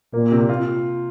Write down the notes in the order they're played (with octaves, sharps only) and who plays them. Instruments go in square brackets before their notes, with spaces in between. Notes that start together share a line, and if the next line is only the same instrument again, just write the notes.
[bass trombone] A#2 [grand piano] A#3
[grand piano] C3
F4